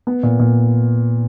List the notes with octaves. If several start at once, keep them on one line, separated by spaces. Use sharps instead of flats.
B3
A#2
A#2